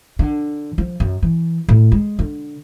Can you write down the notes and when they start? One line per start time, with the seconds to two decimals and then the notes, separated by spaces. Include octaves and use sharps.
0.19 D3
0.78 F3
1.00 F#2
1.22 E3
1.68 A2
1.92 G#3
2.19 D3